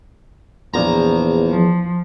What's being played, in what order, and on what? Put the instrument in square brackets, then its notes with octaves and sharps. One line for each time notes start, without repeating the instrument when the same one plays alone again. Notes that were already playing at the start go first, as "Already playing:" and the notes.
[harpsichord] A#1 A#5 [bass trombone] E2
[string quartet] F3